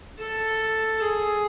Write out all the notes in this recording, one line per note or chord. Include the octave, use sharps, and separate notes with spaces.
A4
G#4